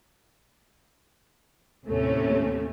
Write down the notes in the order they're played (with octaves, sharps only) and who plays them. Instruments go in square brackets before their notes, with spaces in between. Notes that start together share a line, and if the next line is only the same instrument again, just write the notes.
[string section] D#2 A2 C3 A3 C#4